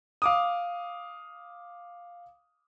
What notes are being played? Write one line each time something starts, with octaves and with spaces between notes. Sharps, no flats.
F5 D6 D#6